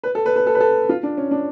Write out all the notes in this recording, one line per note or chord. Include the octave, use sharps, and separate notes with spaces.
B4
A4
B4
B4
A4
B4
A4
F4
D4
C#4
D4